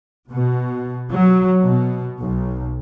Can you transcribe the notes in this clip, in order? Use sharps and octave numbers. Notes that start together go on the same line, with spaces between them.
B2
F#3
B2
B1